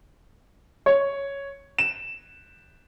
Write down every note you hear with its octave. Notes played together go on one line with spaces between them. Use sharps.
C#5
E7